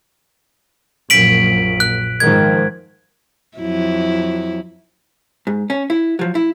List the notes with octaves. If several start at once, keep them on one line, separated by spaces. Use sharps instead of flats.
A#1 F#2 B6 D7 F#7
F#6
G#2 D#3 F3 G#6
F2 F#3 E4
G#2
C#4
E4
F3 F#3
E4